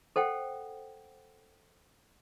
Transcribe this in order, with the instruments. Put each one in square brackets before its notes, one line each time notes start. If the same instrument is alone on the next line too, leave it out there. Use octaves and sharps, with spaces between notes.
[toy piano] A4 C5 F#5 G5